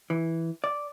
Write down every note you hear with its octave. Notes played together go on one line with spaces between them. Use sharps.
E3
D5